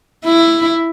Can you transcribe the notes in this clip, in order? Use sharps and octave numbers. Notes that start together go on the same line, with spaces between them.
E4